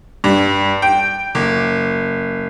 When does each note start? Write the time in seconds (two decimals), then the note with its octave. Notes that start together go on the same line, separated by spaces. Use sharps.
0.24 G2
0.82 G5
1.35 F#1